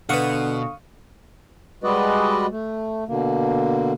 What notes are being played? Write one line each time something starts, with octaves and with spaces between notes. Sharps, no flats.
B2 D3 B4 F5 F#5 C#6 D#6
G3 G#3 F#4 B4 D5 D#5
A3
B2 D3 A#3